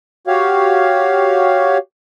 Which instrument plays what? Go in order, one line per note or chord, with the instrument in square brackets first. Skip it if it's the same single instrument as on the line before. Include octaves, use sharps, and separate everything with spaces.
[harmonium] F#4 G4 C#5 F5